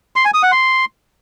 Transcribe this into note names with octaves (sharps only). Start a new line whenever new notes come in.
C6
G#5
D#6
F#5
C6